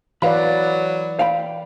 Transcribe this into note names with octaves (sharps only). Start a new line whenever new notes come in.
E3 F#3 B4 D5 F5 B5
F5 G5 B5